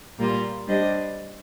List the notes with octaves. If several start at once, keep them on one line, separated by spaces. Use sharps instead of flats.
A#2 G3 A#3 F4
G3 D4 G4 C5 D#5